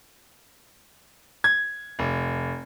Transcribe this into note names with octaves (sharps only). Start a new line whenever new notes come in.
G#6
F1